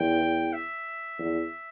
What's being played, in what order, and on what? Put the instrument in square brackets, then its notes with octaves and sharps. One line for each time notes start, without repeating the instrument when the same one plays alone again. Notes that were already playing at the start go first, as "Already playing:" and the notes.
Already playing: [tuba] E2 [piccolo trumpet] G5
[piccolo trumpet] E5
[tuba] E2